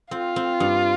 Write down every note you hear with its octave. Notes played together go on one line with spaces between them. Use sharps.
C4 F4
C4
G2